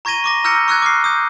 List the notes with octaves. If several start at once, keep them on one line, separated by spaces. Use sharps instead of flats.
A#5 C#6 G#6 A#6 D#7 G7
C#6 D6 A#6
A#5 E6 F6 G6 A#6 C#7
C#6 E6 F#6 G#6
D6 F6 C7
D#6 G6